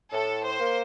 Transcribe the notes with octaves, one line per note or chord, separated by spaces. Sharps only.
A2 A4
C5
A#3